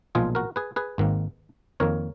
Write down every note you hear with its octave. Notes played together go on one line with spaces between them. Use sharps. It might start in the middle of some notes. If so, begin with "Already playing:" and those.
B1 A#2 F3 G#3 F4 G#4
F#4 A#4
G#4 B4
G#4 B4
G#1 G#2 D#3 A#3
F2 D#3 A#3 A#4 C#5